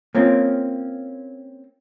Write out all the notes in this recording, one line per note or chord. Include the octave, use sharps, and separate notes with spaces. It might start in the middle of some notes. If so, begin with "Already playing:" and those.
A#3 C4 C#4 F4